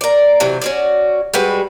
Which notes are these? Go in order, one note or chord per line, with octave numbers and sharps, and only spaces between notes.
A#4 D5
C3 E3 F#3
C#4 F#4 D5
G3 G#3 F#4 B4